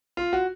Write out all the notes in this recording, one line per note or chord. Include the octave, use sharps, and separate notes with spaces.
F4
F#4